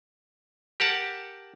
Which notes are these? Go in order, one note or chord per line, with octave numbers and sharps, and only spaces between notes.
G4 A#4 F#5 A5